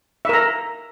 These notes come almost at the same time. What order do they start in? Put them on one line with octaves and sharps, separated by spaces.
E5 A#4 A#5